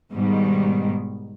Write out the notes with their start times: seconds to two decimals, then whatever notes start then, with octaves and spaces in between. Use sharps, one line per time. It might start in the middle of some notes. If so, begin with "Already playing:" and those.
0.11 G#2 B2 D#3 G3